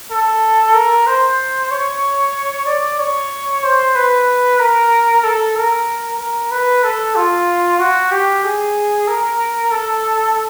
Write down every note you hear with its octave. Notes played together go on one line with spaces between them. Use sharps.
A4
A#4
C5
C#5
D5
C#5
C5
B4
A#4
A4
A#4
A#4
B4
A4
F4
F#4
G4
G#4
A#4
A4